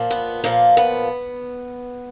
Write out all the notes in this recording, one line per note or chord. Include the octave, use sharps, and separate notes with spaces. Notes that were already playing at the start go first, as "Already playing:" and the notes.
Already playing: A#2 F3
B3
A#2 F3 A#3
B3